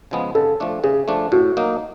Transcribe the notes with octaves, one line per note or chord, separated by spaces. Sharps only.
C#3 F3 G#3 B3
C#3 A4
F3 A3 D4
C#3 G#4
F3 A3 D4
A2 F#4
F#3 A#3 D#4